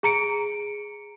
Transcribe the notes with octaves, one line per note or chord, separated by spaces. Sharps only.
G#4 A#5 C#7 D7